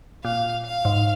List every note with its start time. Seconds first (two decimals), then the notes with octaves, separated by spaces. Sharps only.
0.24 A#2 F5
0.65 F5
0.85 G#2